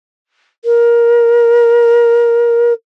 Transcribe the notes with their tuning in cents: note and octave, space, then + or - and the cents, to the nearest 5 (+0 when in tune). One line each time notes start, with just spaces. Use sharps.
A#4 +15